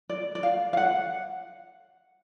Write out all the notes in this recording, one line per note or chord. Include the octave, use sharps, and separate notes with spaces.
D5
D5
F5
F5
F#5